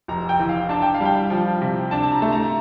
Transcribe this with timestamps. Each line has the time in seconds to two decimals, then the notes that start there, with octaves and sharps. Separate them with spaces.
0.08 F1 A#5
0.29 G5
0.39 E3
0.49 F5
0.69 D4 A5
0.82 G5
0.94 F5
1.01 G3 G5
1.30 F3
1.62 C3
1.91 D4 A5
2.03 A5
2.12 A#5
2.22 A3
2.32 A#5